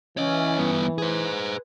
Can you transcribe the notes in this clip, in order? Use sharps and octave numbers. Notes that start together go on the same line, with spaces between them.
E3 C#4 C#5 D#5
G2 B3
G#4 B4 C5